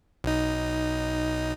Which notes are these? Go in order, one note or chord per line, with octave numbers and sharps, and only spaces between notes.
B1 D#4